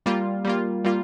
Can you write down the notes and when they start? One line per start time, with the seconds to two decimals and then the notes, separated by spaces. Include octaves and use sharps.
0.06 G3 A#3 F4
0.45 G3 A#3 F4
0.84 G3 A#3 F4